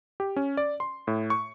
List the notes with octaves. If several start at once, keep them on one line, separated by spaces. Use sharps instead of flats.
G4
C#4
D5
C6
A2
C#6